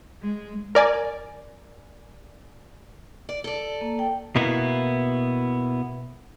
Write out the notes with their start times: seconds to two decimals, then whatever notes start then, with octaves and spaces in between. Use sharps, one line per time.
0.22 G#3
0.75 A#4 D5 G#5
3.29 D5
3.44 A4 D5
3.81 A#3
3.99 G5
4.36 B2 A#3 B3 E4